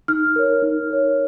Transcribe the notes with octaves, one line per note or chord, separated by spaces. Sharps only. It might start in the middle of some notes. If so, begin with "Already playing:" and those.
D#4 F6
A#4 C#5
D#4
A#4 C#5